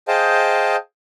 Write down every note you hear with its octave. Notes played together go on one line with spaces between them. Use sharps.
G#4 C5 D#5 F5 G5 A5